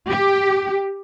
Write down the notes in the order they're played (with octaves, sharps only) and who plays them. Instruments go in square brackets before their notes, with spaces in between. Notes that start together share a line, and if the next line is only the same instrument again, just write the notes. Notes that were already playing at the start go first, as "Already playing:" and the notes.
[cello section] G4